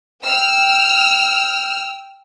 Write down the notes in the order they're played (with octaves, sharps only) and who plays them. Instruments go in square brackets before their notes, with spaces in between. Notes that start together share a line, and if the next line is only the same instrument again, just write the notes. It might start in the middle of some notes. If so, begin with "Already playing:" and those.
[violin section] G5 E6 F6